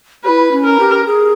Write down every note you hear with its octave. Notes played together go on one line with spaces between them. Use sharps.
E4 G4 B4
C#4
A#4
G4
G#4